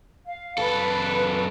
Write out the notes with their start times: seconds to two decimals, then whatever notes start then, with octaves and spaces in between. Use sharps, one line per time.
0.25 F5
0.58 F#2 A4 B4